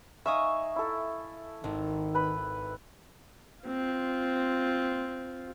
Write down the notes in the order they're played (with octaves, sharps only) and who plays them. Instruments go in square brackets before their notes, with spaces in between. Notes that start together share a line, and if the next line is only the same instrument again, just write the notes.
[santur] D#4 F5 C#6 [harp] E5 G#5 D#6
[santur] E4 A4
[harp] G#1 [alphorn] D#3
[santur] B4 B5
[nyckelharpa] C4 F4